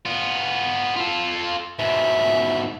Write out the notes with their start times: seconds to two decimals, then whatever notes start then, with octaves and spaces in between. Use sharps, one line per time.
0.06 B3 F4
0.96 F4 A4
1.79 G#2 B2 E5